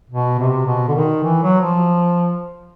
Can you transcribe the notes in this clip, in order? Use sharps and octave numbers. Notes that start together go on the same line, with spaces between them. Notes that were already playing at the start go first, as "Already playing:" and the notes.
B2
C3
B2
D3
D#3
E3
F#3
F3